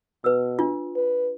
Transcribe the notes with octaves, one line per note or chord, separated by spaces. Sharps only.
B2 B4 E6
D4 F4
B4